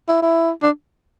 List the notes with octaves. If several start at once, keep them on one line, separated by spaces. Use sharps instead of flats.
E4
E4
D4